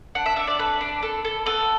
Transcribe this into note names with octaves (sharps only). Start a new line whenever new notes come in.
D4 F#5
E5
D4 E5
D5
A4 B4
D4
A4
A4
B3 A4